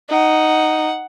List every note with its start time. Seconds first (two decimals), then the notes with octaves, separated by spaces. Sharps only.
0.10 D#4 F#5